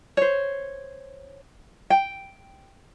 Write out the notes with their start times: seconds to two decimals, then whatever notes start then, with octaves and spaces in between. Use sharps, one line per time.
0.17 C5 C#5
1.90 G5